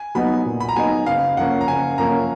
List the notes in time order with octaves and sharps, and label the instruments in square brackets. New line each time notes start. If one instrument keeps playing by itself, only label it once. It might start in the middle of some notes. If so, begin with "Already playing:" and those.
Already playing: [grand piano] G#5
[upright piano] F#3 B3 D#4 [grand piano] B5
[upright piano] A#2
[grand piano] B5
A#5
[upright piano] F#3 B3 D#4 [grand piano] G#5
[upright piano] F#1 [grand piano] F5
[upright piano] F#2 F3 A#3 C#4 [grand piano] F#5
[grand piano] A#5
[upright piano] F#1 [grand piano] G#5
[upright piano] F#2 F3 A#3 C#4 [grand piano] A#5